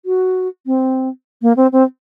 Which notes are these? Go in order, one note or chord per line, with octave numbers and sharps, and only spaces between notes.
F#4
C4
A#3
C4
C4